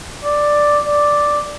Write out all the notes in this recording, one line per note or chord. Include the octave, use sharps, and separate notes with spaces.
D5
D5